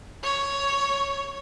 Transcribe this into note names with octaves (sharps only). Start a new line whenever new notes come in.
C#5